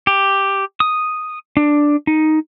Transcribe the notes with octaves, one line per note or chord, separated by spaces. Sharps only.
G4
D#6
D4
D#4